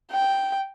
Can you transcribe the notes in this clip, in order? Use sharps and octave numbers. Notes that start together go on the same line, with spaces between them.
G5